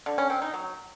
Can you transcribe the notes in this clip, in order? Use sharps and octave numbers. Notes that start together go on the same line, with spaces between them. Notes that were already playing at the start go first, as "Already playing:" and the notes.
D3
C#4
C4
D#4
F#3